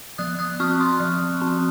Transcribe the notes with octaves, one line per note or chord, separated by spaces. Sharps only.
F3 D#6 F#6
D#6 F#6
C4 C#6 F6
C6 D#6
F3
C4